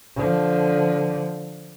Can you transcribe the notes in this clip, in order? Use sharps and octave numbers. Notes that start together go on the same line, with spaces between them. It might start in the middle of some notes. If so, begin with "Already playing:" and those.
D3 F3